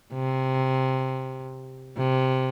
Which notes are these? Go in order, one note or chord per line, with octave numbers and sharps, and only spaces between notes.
C3
C3